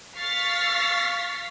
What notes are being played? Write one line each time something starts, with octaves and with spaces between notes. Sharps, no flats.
F5 C#6 F6 A6 B6 C7